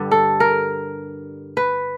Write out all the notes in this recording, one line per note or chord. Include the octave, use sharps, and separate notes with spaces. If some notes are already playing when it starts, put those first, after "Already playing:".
Already playing: G2 D3 G3
A4
A#4
B4